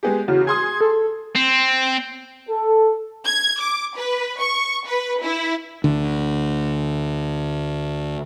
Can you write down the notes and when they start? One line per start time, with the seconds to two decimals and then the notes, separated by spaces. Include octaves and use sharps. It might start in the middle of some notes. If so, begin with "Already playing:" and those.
0.03 G#3 B3 G4 G#4
0.28 E2 C#3 F#4
0.47 G#4 C6 D#6 G#6
0.81 A4
1.35 C4
2.49 A4
3.25 G#6
3.61 D6
3.96 B4
4.40 C#6
4.87 B4
5.22 E4
5.84 D2 D3